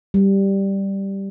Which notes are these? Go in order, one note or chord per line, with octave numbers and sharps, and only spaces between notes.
G3